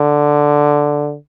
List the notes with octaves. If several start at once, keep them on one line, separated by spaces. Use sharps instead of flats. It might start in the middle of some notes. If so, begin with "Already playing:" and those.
Already playing: D3